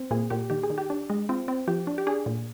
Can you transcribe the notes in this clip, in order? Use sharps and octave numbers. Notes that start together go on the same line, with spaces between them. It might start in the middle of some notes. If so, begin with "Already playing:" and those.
Already playing: C4
A#2 G#4
A#2 G4
D#3 G4
G#4
D#3
G4
D4
G#3
C4 F4
C4
F3 G4
D4
G4
D4 G#4
A#2